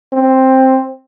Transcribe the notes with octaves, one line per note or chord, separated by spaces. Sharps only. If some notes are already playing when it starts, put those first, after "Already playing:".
C4